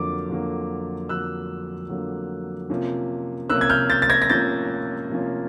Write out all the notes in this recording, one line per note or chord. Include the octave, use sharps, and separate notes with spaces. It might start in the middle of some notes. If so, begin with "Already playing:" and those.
Already playing: F2 D3 F#3 A#3 D6
F2 D3 F#3 A#3
F2 D3 F#3 A#3 E6 F#6
F2 D3 F#3 A#3
C3 F3 A#3 C#4
C3 F3 A#3 C#4 E6 F#6
G#6
F6 G6
G6 A6
A6
G#6 A#6
A#6
C3 F3 A#3 C#4 G6 A6
C3 F3 A#3 C#4